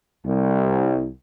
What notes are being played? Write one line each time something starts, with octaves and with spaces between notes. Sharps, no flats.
C2